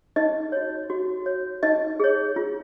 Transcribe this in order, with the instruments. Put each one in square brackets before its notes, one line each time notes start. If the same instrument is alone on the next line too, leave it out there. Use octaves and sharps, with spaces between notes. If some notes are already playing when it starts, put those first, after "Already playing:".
[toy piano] D#4 D#5
F#4 C#5
F#4
C#5
D#4 D#5
G#4 C#5
F4